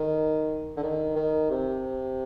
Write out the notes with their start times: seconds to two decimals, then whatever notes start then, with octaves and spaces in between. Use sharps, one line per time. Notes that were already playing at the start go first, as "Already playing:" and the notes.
Already playing: D#3
0.77 D3
0.83 D#3
1.16 D#3
1.50 C3